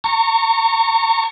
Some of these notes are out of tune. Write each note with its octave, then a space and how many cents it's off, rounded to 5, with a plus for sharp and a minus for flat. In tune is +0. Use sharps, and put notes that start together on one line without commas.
A#5 -35 C#6 +0